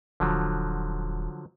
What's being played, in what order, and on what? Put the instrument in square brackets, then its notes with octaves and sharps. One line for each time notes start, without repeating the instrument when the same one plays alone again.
[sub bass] D#1 [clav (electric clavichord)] D3 F3 F#3